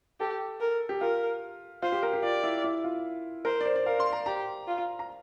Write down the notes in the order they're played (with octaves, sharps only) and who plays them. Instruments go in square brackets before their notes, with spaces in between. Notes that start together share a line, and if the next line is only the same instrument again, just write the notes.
[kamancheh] G4 [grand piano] A4
[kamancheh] A#4
[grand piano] G4
[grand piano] F4 [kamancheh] A#4
[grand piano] F4 [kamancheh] C5
[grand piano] G4
A#4
G4
[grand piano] F4 [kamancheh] D5
[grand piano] E4
E4
F4
[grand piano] A#4 [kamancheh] C5
[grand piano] D5
C5
D5
[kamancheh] A#4 [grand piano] F5
[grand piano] C6
A#5
[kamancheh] G4 [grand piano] A#5
[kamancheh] F4
[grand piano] A#5